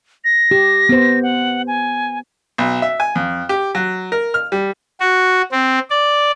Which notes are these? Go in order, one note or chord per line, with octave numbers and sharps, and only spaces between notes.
A#6
G4
B3 C5
F#5
G#5
B1
E5
G#5
F2
G4
F#3
A#4
F6
G3
F#4
C4
D5